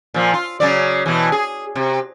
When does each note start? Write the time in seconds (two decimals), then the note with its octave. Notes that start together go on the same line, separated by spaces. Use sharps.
0.14 A#2 F3
0.33 F4
0.60 C#3 F#3 D5
1.06 B2 E3
1.32 G#4
1.75 C3